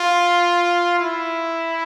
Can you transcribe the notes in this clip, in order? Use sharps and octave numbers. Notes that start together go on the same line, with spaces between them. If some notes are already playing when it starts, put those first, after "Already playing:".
Already playing: F4
E4